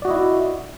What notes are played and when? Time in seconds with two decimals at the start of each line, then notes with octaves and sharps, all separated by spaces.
0.02 D5
0.05 F#4
0.08 D#5
0.10 E4